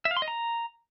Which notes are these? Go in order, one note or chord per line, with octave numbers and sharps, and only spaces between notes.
E5
F5
C6
D#5
A#5